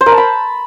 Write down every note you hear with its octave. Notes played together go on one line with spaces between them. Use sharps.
C5
A#4
A5
B5